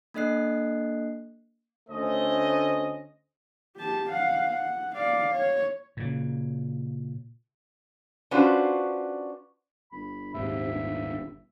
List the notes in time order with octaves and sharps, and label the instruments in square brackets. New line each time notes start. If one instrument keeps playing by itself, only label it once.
[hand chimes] A#3 D4 A4 D#5 F#6 C7
[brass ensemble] D2 D3 A3 C#4 C5 D#5
[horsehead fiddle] G4 A5
F5 F#5
F#5
D5 F5
C#5
[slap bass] A#2 C#3
[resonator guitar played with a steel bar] C#4 D4 F4 F#4 B4 C5
[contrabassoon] G1 [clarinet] B5
[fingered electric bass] D#1 G#2 [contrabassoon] C3 [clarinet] E5
[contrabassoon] G1